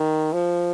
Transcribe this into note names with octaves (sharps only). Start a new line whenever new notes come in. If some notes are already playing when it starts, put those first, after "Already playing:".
Already playing: D#3
F3